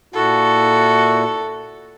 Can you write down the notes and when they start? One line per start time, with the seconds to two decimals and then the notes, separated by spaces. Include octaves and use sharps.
0.14 A#2 E4 F#4 A4